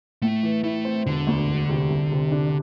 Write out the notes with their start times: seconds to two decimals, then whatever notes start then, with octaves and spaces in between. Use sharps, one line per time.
0.22 A2 A3
0.43 E3
0.64 A3 E4
0.85 C4
1.06 E1 D3
1.27 D2
1.47 E1
1.69 C3
1.89 C2
2.11 C3
2.32 D4